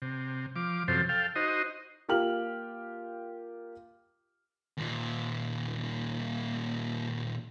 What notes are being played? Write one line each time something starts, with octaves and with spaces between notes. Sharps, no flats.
C3
F3 D6
F#2 C3 F3 A4 C5
A4 F5 G5
D#4 F#4 C5 D#5
A#3 F4 G4 G5 F6 F#7
D#2 A#2